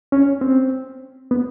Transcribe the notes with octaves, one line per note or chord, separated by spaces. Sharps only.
C#4
C4
B3